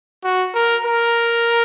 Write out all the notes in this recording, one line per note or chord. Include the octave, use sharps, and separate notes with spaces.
F#4
A#4
A#4